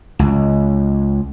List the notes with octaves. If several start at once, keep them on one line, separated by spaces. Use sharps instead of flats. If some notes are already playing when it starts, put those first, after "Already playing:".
C#2